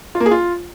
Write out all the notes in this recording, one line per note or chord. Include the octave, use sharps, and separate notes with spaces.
F4
A#3
G#4
F4